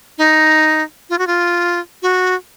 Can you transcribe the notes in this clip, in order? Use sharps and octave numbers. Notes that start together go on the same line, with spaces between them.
D#4
F4
F#4
F4
F#4